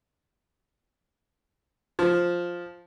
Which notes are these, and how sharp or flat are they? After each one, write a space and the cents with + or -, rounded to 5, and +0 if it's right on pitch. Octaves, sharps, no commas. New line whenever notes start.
F3 +5